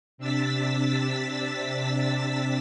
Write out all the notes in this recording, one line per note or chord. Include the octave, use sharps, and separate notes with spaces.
C3 D4 E6 A6 B6